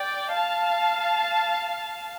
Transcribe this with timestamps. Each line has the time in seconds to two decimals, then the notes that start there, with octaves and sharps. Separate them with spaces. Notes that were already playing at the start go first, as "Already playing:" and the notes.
Already playing: D5 G5
0.34 F5 A5